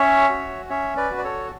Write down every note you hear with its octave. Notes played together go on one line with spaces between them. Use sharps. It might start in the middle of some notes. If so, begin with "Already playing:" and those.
Already playing: C#4 C#5 E5
F#4
C#4 C#5 E5
B4 D5
F#4
D5
A4 C#5